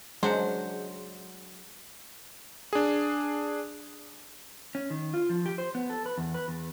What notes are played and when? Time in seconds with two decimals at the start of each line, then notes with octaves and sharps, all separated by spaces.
0.23 F#3 G#3 D4 C5 F#5
2.73 D4 G#4
4.75 C#4
4.90 D#3
5.14 F4
5.29 F3
5.46 G4
5.58 C5
5.75 B3
5.90 A4
6.06 B4
6.18 E2
6.34 B4
6.48 E2